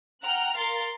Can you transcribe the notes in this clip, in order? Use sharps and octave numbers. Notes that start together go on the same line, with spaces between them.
F#5 G5 A#5 F6 F#6
A#4 F5 C6 A6